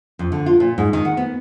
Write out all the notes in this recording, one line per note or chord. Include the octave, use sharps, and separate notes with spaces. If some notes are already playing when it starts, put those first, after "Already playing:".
F2
D3
F4
A#2
G#2
D#3
F#5
B3